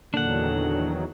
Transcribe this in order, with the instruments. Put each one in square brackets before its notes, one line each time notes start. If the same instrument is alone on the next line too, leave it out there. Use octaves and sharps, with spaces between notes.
[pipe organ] E2 D#3 F#3 [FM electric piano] A#2 A#3 [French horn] D3 [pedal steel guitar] D4 F#5